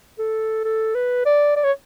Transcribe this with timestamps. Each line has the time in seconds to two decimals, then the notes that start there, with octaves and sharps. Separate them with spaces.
0.19 A4
0.64 A4
0.95 B4
1.26 D5
1.56 D5
1.64 C#5